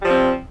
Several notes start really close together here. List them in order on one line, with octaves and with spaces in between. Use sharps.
G3 F3 C4